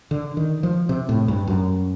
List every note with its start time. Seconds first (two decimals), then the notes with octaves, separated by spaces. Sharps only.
0.11 D3
0.37 D#3
0.63 F3
0.89 C3
1.09 A2
1.28 G2
1.47 F#2